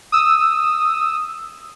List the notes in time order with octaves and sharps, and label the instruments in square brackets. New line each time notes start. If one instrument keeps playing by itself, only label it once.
[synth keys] D#6 E6